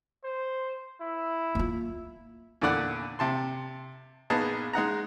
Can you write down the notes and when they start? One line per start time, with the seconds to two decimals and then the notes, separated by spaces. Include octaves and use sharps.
0.24 C5
1.01 E4
1.55 A#3 F4
2.61 E2 A#2 D3 D5 F#5
3.19 C3 A5 C6
4.30 A#1 B3 D#4 G#4 A5
4.73 G#3 D#4 F#5 A#5